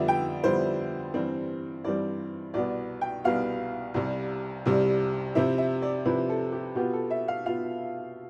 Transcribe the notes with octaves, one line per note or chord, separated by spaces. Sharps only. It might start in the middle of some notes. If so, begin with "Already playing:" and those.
Already playing: F2 D3 G3 B3 D5 E5
G5
F2 D3 G3 B3 E4 C5
G2 E3 G3 C4
G2 E3 G3 C4 D5
C2 B2 B3 D5
G5
C2 B2 B3 F5
C2 C3 G3
C2 C3 G3
C3 F3 C4 E4 E5
E5
D5
C3 F3 C4 E4 B4
A4
G4
B2 B3 F4 G4
A4
E5
F5
B2 B3 F4 F5